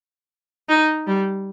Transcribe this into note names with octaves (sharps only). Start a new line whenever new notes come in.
D#4
G3